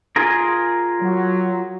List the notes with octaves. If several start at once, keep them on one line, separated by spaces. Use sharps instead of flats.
F4 G#4 A#4
F#3